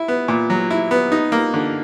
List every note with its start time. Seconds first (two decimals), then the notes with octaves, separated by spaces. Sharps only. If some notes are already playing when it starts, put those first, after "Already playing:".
Already playing: E4
0.08 B3
0.28 A#2
0.50 F#3
0.71 E4
0.91 B3
1.12 D#4
1.32 A#3
1.54 D3